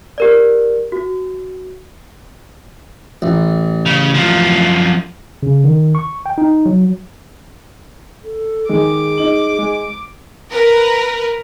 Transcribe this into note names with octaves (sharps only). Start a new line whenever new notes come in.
G4 A#4 D5
F#4
A1
C#3
F#2 F3
C#3
D#3
C#6
G5
D#4
F#3
A4
D#3 G#3 G#4 D6
D#4 F#7
G#3
A#4 B4